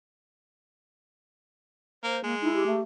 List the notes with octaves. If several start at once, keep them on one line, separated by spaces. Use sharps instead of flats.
A#3 C5
G#3 A#3
D#4 E4
G4
A3